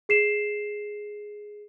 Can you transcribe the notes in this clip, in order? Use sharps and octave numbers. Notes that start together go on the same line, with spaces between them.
G#4 C7 E7